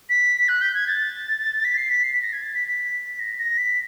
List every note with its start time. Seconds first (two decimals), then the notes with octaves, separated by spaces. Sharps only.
0.09 B6
0.48 F#6
0.61 G6
0.74 G#6
0.87 A6
1.64 B6
1.77 C7
1.90 B6
2.03 C7
2.13 B6
2.22 A#6
2.33 G#6
2.42 A6
2.55 B6
2.68 B6
3.19 A#6
3.39 A#6
3.58 B6